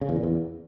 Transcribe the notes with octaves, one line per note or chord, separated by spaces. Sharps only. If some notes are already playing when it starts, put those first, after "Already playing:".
C#3
E2
A#2
E2